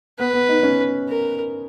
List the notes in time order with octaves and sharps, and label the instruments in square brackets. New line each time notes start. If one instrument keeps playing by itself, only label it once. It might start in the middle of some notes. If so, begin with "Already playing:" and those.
[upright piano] B3 [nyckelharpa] B4
[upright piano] B3
D#4
C#4
[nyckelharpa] A#4